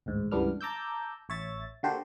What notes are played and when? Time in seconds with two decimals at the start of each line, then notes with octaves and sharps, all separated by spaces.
0.06 A1 D2 G#2
0.31 C#2 G2 E3 B3 D4 F6
0.61 A5 A#5 D6 E6 G6
1.29 A1 C#5 E5 A6
1.83 D3 A#3 F#4 G4 A4 C5